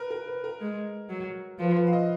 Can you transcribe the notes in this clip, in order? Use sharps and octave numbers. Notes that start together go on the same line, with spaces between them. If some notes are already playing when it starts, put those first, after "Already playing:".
Already playing: A#4 B4
A#4
B4
A#4
G#3
F#3
F3 B4
B4
F5
D#5